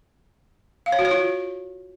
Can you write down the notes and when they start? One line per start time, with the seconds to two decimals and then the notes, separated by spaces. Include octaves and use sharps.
0.86 F5
0.92 C#5
0.99 F#4
1.05 C#5
1.11 F4